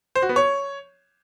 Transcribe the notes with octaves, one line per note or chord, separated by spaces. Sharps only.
C5
F#4
B3
C#5